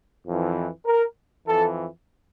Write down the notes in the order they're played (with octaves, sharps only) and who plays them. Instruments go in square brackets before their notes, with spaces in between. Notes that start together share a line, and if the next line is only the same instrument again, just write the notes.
[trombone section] F2 E3
A#4
F2 E3 A4